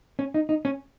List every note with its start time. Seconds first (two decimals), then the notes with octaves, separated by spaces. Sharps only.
0.19 C#4
0.34 D#4
0.49 D#4
0.65 C#4